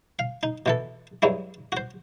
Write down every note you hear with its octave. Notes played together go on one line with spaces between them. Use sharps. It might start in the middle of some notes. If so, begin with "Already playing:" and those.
F5
D#4
B2 E3 A4
G2 F#3 G#3 E4
F#4 C5